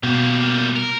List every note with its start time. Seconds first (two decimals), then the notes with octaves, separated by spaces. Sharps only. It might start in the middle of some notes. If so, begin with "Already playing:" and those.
0.03 B2 G3 A#3
0.76 A#4